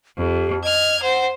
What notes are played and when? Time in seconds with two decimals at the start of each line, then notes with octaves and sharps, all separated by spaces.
0.19 F2 G4
0.64 D#5 F6 G#6
1.02 C5 F#5